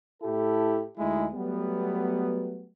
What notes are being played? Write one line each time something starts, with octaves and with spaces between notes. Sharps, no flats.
A2 E4 G4 A4
D2 G#3 A3 D#4 E4 G#4
F#3 G3 A3 B3